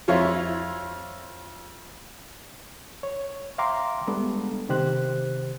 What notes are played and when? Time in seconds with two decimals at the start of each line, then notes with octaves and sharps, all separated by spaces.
0.08 F2 E4 F4 C#5
3.03 C#5
3.58 E5 F5 G5 A#5 C6 D6
4.07 G3 G#3 B3 D4 A4
4.69 C3 D#3 G4 C5 F#6